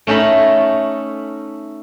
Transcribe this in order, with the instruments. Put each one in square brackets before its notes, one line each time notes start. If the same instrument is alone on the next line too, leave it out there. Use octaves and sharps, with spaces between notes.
[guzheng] A3 C#4 D#4 A4 B5